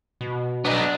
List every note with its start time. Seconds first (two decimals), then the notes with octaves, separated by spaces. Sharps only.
0.21 B2
0.65 B3 D4 D#4